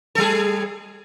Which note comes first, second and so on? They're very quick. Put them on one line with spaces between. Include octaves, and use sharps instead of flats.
A4 G3 G#4